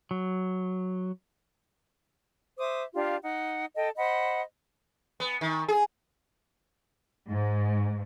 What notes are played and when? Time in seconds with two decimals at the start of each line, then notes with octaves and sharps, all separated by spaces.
0.11 F#3
2.59 C5 E5 D6 D#6
2.94 D4 F4 G4 F5
3.22 D#4 F#5
3.75 A4 D#5 G5
3.97 C5 D#5 F#5 B5
5.20 B3
5.41 D#3
5.68 G#4
7.28 G#2